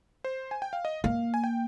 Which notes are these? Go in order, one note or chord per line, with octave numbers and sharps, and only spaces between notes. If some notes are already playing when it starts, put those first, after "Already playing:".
C5
G#5
G5
F5
D#5
A#3 F5
G#5
G5